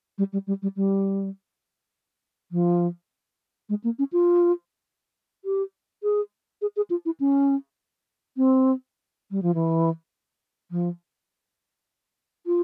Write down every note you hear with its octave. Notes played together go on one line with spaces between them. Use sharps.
G3
G3
G3
G3
G3
F3
G#3
A#3
C#4
F4
G4
G#4
G#4
G#4
F4
E4
C#4
C4
G3
F3
E3
F3
F4